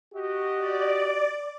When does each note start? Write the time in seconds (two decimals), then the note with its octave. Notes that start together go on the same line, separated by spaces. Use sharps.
0.14 F#4 G4 D#5
0.57 D5